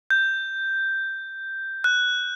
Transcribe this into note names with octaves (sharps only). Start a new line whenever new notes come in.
G6
F#6